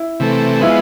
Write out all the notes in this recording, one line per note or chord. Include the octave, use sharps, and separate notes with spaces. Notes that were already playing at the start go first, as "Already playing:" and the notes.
Already playing: E4
C3 E3 A3
F3 G#3 B3 E4